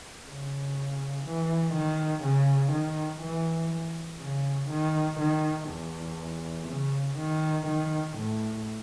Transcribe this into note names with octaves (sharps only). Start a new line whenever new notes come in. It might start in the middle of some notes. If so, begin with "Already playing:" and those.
C#3
E3
D#3
C#3
D#3
E3
C#3
D#3
D#3
E2
C#3
D#3
D#3
A2